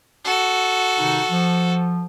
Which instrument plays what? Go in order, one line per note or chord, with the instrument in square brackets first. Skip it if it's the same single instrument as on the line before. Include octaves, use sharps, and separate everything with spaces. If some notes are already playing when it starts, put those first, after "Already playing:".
[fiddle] F#4 A4
[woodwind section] C3 D#3 D#4
F3